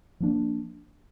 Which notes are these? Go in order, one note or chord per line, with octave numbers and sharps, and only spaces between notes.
F3 A#3 D4